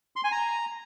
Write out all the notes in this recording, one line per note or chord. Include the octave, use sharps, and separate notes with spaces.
C6
G#5
A#5